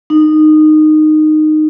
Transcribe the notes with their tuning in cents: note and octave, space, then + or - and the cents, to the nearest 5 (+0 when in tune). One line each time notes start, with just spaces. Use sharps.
D#4 -15